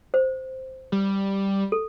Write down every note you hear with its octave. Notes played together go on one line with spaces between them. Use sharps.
C5
G3
A4